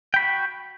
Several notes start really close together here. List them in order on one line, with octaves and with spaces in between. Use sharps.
G5 B5 F#4